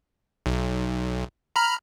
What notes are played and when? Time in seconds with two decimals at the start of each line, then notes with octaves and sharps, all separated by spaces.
0.46 B1
1.56 A#5 B5 F6